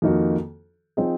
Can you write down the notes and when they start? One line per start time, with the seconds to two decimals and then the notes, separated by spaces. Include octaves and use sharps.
0.02 F2 D#3 A#3 D#4 F#4
0.97 F3 C4 D#4 G#4